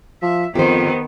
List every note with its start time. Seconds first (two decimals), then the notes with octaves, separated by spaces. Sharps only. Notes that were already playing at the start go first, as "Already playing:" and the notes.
0.22 F3 E5
0.55 F2 D#3 B3 G4 C5